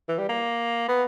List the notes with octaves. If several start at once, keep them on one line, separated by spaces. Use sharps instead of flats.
E3
G3
A#3
B3